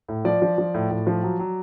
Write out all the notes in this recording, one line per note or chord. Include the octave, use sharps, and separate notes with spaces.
A2
F3 D5
F3
F3
A2
A2
F3
F#3
F#3